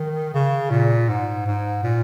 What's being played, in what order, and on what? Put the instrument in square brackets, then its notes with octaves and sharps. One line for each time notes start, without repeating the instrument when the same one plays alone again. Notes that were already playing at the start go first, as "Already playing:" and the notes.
Already playing: [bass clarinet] D#3
C#3
A#2
G#2
G#2
A#2